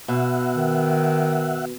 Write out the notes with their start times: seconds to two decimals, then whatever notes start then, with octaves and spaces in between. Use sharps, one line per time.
0.08 B2 E5 F#5
0.55 D#3